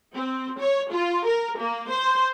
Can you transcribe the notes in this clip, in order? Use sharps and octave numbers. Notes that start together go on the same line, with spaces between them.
C4
C#5
F4
A#4
A#3
C5